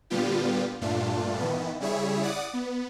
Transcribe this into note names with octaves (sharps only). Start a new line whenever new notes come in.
A#2 D3 G3 B3 F4 G4
G2 A#2 A3 D4 F4
D#3 E3 B3
C#3 G3 E4 G#4 C#5 E5
D5 F#5 D6 D#6
B3